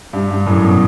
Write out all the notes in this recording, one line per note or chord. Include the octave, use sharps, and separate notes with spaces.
G2
G2
F#2 A2
B2